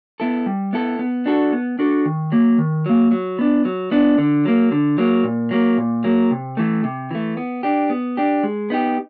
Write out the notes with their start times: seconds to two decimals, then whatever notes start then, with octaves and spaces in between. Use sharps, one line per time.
0.20 B3 E4 A4
0.46 G3
0.73 B3 E4 A4
0.99 B3
1.26 D4 F#4 A4
1.53 B3
1.79 D4 F#4 A4
2.05 D#3
2.32 F#3 A#3
2.58 D#3
2.86 F#3 A#3
3.11 F#3
3.39 B3 D4
3.65 F#3
3.91 B3 D4
4.18 D3
4.45 F#3 A#3
4.72 D3
4.98 F#3 A#3
5.24 A#2
5.51 F#3 A#3
5.78 A#2
6.04 F#3 A#3
6.31 C3
6.57 E3 A3
6.84 C3
7.11 E3 A3
7.37 B3
7.63 D4 G4
7.90 B3
8.17 D4 G4
8.43 G#3
8.70 B3 D#4 G4